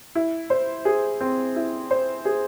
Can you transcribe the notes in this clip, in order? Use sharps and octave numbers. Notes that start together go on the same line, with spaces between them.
E4
C5
G#4
C4
E4
C5
G#4